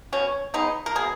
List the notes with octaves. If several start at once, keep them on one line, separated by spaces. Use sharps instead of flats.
B2 C#4
G#3 B3 D#4
A#4
B2 G#4